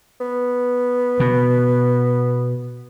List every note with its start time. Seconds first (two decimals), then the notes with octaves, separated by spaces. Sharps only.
0.20 B3
1.20 B2